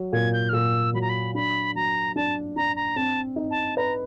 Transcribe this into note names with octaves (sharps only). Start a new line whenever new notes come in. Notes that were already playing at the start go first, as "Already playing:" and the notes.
Already playing: F#3
A#2 G#6
G6
F6
A#2 E6
F#3 B5
A#5
B5
D4 B5
F#3 A#5
D4 A5
D4 A#5
A#5
C4 A5
D#4
A5
B4 A#5